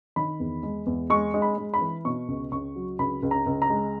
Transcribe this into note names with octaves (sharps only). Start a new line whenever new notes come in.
D#3 B5
E2
G#3
E2
G#3 C#6
G#3
B5
G#3
B5
E3
B2 C#6
C#2
C#2 C#6
F#3
C#2 B5
C#2
A#5
C#2
A#5
G#3